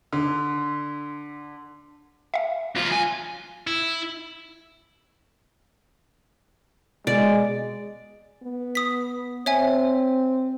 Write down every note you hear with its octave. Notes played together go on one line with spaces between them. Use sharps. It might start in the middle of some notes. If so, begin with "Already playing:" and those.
D3
E5 F5
E2 F4
F#2 G#5
E4
B2 G#3 D5
B3
D#6 B6
C4 C#5 E5 G#5